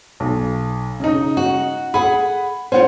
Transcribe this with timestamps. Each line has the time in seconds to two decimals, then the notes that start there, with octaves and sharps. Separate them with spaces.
0.20 B1
1.00 C#3 D#4
1.37 F#4
1.94 G#4 F#5 B5
2.72 C#4 D#4 F4 C5 F#5